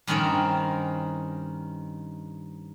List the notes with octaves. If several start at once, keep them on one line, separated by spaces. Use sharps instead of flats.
G2 D#3 C4 C#4 A#4